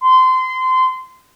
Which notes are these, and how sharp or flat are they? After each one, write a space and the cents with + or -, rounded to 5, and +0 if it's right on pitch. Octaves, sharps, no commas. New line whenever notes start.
C6 -25